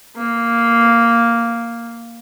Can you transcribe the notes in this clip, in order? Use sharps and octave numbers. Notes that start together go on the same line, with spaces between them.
A#3